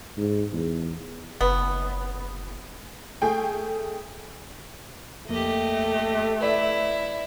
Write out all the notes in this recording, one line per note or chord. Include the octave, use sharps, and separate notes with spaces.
G#2
E2
F#1 B3
A3 G#4 G5
F2 A3 A#3 G4 D#5
E4 B4 D5 E5